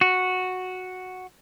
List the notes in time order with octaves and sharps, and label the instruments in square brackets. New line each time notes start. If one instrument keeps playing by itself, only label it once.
[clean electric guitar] F#4